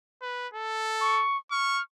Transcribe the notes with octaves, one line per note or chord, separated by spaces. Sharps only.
B4
A4
C#6
C#6 F6